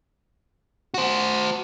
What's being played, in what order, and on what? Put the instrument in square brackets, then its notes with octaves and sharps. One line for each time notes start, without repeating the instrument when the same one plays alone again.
[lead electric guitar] F#4 C5